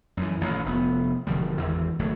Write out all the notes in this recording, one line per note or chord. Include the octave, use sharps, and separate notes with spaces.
F#2 E3
A1 A#2 D#3
F1 B3
E1 D3 F3 G3
G#1 E2 E3
G#1 A2 D3 F#3